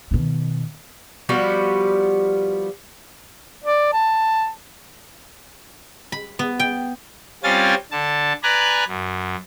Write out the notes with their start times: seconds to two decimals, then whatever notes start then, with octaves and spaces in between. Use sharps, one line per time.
0.11 B2 D#3
1.29 F3 G3 B3 F#4
3.64 D5
3.93 A5
6.12 B5
6.39 B3
6.60 G5
7.44 G3 C4 C#4 F4 G#5 A6
7.91 D3 A5
8.43 B4 D5 G#5 A#5 F#6
8.88 F#2